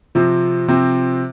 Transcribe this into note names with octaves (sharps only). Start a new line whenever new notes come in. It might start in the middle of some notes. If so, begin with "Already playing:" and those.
C3 F3 C4
C3 F3 C4